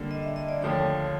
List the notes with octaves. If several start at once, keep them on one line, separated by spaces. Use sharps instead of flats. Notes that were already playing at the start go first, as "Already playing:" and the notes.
Already playing: D3 G3 A#3 D4 D5
D#5
E5
D#5
D5
D#2 D3 F3 A3 D4 C#5